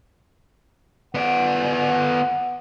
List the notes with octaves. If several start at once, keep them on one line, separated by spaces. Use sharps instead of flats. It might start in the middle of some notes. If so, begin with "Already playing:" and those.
B3 D5 F#5